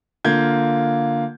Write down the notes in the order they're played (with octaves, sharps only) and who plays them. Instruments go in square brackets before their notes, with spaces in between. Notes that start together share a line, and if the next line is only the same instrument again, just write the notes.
[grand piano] D3 A#3 F4 G6 G#6